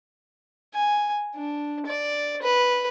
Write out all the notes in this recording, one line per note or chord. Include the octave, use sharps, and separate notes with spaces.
G#5
D4
D5
B4